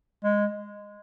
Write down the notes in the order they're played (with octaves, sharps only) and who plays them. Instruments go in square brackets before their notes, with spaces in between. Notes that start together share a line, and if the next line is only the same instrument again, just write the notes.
[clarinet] G#3